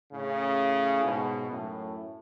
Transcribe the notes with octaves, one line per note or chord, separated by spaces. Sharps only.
A2 C#3
G#2 B2
F#2 A2